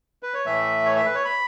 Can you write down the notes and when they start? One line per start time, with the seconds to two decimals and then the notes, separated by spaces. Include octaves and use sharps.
0.23 B4
0.34 C#5
0.46 A2 E3 A3 E5
0.86 C#5
0.96 E5
1.06 B4
1.15 C#5
1.25 B5